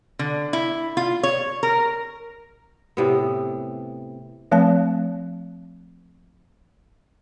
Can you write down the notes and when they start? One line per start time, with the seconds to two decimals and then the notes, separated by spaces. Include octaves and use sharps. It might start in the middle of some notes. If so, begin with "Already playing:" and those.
0.19 D3
0.53 E4
0.97 F4
1.23 C#5
1.63 A#4
2.97 A2 C3 B3
4.52 F3 A3 C4 A5